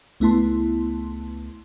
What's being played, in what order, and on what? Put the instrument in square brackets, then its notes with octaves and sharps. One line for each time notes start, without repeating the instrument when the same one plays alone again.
[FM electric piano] C#2 A3 B3 E4 A5 C6